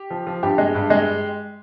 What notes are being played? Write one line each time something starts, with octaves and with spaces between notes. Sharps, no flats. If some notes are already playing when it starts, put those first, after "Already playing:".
Already playing: G4
F3
F3
G2 G4
G#3
G2
G#3